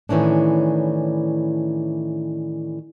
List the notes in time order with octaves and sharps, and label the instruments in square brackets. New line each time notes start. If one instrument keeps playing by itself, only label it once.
[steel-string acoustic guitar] A2 D#3 E3 C#4 D4